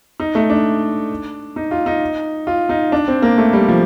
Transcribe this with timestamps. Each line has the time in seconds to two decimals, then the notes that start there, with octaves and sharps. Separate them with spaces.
0.20 D#4
0.35 A3
0.50 D4
1.56 D#4
1.71 F4
1.86 D#4
2.47 F4
2.69 D#4
2.92 D4
3.08 C4
3.22 A#3
3.38 A3
3.53 G3
3.68 F3